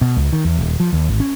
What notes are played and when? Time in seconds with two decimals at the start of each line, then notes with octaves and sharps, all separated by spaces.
0.01 B2
0.17 C#2
0.33 D#3
0.45 E2
0.58 D#1
0.80 F3
0.93 D#2
1.08 G#1
1.20 C#4